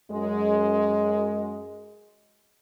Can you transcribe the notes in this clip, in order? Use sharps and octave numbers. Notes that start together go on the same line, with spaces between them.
F#2 G#3